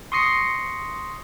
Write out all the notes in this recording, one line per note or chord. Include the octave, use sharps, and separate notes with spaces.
C6 C#6 D#6 A#6 C7 C#7